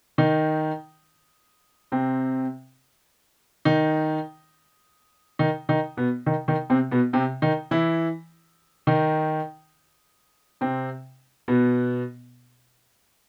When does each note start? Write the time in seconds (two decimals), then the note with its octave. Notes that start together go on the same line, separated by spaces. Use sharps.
0.18 D#3 D#4
1.92 C3 C4
3.65 D#3 D#4
5.39 D#3 D#4
5.69 D#3 D#4
5.97 B2 B3
6.26 D#3 D#4
6.48 D#3 D#4
6.70 C3 C4
6.91 B2 B3
7.13 C3 C4
7.42 D#3 D#4
7.71 E3 E4
8.87 D#3 D#4
10.61 C3 C4
11.48 B2 B3